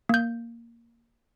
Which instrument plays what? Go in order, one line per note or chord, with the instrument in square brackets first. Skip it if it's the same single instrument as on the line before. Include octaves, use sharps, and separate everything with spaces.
[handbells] A#3 G6